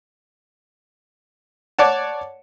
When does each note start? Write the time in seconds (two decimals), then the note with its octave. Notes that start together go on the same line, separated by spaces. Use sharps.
1.79 C#5 D5 F#5 A5